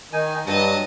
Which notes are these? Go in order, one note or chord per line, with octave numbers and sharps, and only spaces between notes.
D#3 D#4 G#5
G2 F#3 D#5 A5